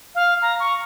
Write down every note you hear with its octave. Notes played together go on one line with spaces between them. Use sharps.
F5
A#5
C#6